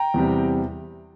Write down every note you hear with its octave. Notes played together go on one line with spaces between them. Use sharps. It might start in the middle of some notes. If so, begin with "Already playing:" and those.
Already playing: G5 A#5
E2 C3 G3